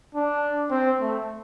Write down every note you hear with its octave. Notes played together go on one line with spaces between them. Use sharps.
D4
C4
A3